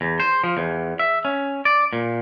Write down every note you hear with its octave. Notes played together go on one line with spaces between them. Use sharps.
E2
C5
F3
E2
E5
C#4
D5
A#2